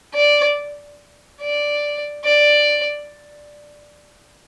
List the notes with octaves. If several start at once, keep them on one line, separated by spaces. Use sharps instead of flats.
D5
D5
D5